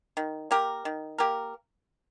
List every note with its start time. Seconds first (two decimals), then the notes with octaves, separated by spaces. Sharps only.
0.17 D#3
0.51 A#3 G4 A#4
0.85 D#3
1.18 A#3 G4 A#4